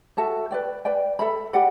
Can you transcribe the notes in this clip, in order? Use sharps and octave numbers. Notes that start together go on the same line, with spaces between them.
F#4 A4 E5 A5
B4 D5 G5
B4 D5 G5
A4 E5 B5
G4 D5 F#5